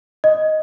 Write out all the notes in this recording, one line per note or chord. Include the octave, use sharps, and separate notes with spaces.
D#5